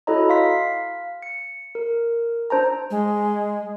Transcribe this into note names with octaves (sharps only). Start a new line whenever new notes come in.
E4 F#4 A4 C#5 D#5 A#5
F5 C6 B6
C#7
A#4
D4 C5 A5 A#5
G#3